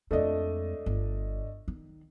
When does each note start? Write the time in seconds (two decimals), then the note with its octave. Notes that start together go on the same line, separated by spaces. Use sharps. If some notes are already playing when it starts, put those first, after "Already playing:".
0.11 F2 G#3 A3 D4 D#5
0.86 G1
1.68 D#3